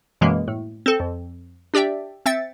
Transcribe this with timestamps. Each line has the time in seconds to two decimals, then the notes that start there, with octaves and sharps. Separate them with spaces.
0.21 F#2 B2 E3 G#3 A#3
0.48 A2
0.86 C4 A4
1.00 F2
1.74 D4 G4 D5 E5 G5
2.26 C4 E5 G5 A6 C#7